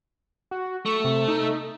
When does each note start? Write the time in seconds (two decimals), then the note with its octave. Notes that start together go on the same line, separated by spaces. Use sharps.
0.51 F#4
0.86 A3 C#6
1.04 C3
1.28 D#4